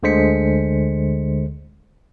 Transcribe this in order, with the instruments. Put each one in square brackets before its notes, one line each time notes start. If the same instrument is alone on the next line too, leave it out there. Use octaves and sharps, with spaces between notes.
[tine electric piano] D2 D3 G#3 C5 B6 C#7